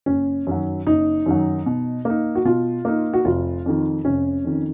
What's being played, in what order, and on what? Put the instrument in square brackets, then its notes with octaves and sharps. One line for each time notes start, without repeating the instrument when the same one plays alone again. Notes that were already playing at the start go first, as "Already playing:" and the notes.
[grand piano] F#1 [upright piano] C#4
[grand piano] F#2 D#3 F#3
[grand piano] F#1 [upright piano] D#4
[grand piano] F#2 D#3 F#3
B2
A#3 D#4
[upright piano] F#4
[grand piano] B2 [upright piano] F4
[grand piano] A#3 D#4
[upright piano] F#4
[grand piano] F1 [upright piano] F4
[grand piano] F2 D#3
[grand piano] F1 [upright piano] C#4
[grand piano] F2 D#3